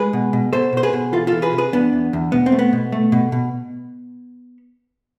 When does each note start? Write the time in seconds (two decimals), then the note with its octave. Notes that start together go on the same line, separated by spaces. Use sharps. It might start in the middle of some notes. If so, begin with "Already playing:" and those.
Already playing: G#3 G#4 B4
0.13 B2
0.33 B2
0.53 B2 A4 C5
0.73 B2 C5
0.83 G#4 B4
0.93 B2
1.12 E3 F4 A4
1.27 E3 F4 A4
1.42 G#4 B4
1.53 C3
1.58 G#4 B4
1.72 E2 B3 D4
1.93 E2
2.13 E2
2.32 B2 B3
2.46 C4
2.52 A3
2.59 B3
2.73 B2
2.92 A3
3.12 B2
3.32 B2